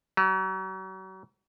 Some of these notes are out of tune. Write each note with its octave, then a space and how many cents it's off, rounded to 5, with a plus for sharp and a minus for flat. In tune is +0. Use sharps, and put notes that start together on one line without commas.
F#3 +40